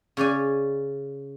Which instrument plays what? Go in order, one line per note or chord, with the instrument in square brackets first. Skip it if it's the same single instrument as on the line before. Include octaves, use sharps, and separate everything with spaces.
[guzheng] C#3 C#5 D5 G#5